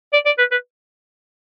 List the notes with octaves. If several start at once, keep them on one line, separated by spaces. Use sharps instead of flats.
D5
D5
B4
B4